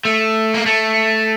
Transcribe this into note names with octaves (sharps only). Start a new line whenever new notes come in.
A3
A#3
A3